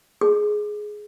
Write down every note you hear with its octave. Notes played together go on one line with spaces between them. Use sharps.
G#4